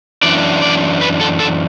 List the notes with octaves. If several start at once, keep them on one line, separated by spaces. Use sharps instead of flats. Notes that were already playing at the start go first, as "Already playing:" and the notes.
F#2 E3 D4 D5
D5
B4
A4
A4